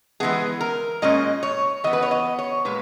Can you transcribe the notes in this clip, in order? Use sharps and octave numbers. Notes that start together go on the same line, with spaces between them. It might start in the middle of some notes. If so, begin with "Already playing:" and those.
E3 G#3 B3 G#4
A#4
A#2 G#3 C#4 D#5
C#5
E3 B3 D#5
B4
C#5
D#5
C#5
A#2 G#3 B4